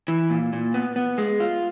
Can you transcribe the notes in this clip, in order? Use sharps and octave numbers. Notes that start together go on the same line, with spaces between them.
E3
A#2
A#2
B3
B3
G#3
F4